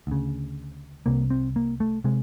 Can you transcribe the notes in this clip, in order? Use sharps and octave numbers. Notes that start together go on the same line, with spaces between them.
D2 C#3
C2 C3 A#3
C4
A#3
A3
C3 G#3